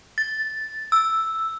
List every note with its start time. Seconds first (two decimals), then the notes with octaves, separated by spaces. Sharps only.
0.18 A6
0.92 E6